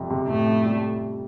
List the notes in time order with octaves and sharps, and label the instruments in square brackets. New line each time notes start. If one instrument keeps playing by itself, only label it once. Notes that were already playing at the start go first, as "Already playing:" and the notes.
Already playing: [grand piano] F2 C3 G3
C3
[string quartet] A2 A3 [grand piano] C3
[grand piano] F2
G3